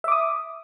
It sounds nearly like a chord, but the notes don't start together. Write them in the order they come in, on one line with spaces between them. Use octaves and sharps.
E5 D6 D#6